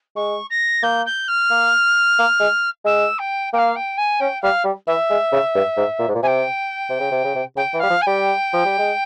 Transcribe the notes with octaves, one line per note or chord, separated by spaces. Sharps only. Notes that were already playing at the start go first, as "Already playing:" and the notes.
G#3 C#6
A#6
A#3 G6
G6
F6
A#3
A#3
G#3
G#3 E6
G5
A#3 F5 G5
G5
G#5
C#4 G5
G3 F5
G3
E3 E5
G#3
C#3
G2
G#2
A#2
G#2
A#2
C3 G5 G#5
C3
C#3
C3
C#3
C3
C#3 G5
E3
G3 F5
F3
G#5
G3 G5
F3
G3
G#3